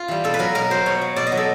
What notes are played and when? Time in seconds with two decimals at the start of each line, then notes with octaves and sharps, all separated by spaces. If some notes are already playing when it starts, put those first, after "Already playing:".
Already playing: F4
0.08 E3 G3
0.24 B2 A4
0.34 B4
0.39 F#3 A#4
0.55 B2 A#4
0.70 F#3 C5
0.86 B2 C#5
1.01 F#3
1.16 B2 D5
1.27 D#5
1.32 F#3
1.37 A4